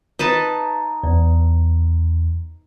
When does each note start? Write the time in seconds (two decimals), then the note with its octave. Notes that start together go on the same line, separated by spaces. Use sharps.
0.19 D#4 B4 A5
1.03 E2